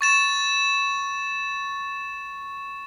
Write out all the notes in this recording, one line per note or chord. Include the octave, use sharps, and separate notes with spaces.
C#6 A6 E7